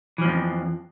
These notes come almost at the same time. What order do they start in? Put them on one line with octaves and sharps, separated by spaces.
E3 F3 G#2 F2